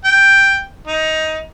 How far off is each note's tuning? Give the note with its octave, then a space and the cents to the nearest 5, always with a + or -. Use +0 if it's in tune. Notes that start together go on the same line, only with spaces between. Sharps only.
G5 +5
D#4 +15